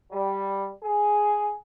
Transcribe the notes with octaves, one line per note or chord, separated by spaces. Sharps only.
G3
G#4